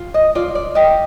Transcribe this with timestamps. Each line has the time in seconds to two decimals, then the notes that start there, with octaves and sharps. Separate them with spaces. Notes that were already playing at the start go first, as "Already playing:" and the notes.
Already playing: F4
0.14 D#5
0.35 F4 D5
0.55 D5
0.75 G4 D#5